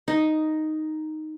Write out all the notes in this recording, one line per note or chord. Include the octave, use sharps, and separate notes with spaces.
D#4